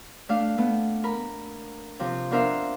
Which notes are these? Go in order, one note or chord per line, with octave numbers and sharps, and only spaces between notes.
A3 D4 F5
A3 B3
A#4 B5
C3 F3
B3 D4 A#4 C5 E5 F5